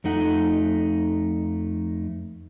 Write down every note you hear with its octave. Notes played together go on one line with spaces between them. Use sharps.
F2 A3 D#4 F#5